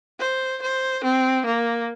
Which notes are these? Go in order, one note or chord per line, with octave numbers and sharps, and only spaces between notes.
C5
C5
C4
A#3